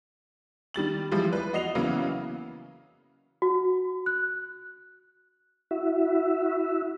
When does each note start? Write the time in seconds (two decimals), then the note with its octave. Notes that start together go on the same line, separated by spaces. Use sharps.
0.74 D#3 G3 A6 F#7
1.11 E3 F3 G3 G#3
1.33 B4
1.53 F#4 D#5 C7 F7
1.75 C#3 E3 F#3 A#3 B3
3.42 F#4
4.06 F#6
5.71 E4 F#4 E5